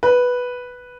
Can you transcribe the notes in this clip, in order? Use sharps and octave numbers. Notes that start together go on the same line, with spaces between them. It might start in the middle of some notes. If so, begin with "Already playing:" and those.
B4